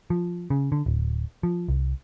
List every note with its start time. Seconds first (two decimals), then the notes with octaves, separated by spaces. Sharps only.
0.10 F3
0.50 C#3
0.72 D3
0.86 D1
1.43 F3
1.68 C2